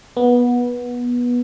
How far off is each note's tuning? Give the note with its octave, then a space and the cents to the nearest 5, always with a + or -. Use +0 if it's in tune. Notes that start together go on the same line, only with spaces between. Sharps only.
B3 -20